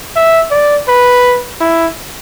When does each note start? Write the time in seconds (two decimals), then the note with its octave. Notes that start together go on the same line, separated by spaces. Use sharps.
0.16 E5
0.51 D5
0.88 B4
1.61 E4